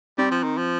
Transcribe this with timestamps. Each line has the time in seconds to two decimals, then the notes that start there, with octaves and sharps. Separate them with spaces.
0.18 G3 C4
0.31 F3
0.43 D#3
0.58 F3